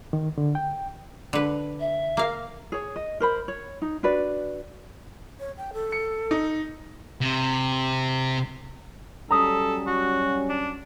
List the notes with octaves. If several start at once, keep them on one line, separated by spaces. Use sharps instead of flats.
D#3
D3
G5
D3 B4
E5
A#3 F5
G#4 C#5
D#5
A#4 C5 B5
C#5
D#4
D4 F#4 B4 D5
C#5
G5
A4
C#7
D#4
C3
F#3 G3 C#4 A4 A#5 D#6 B6
F#4
D4